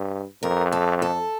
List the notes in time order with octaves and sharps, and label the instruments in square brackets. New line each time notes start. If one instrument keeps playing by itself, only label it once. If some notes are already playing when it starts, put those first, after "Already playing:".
Already playing: [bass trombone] G2
[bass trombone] F2 [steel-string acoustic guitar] A#4
[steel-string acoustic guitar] A4
A4